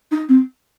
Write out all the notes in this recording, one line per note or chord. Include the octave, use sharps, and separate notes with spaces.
D#4
C4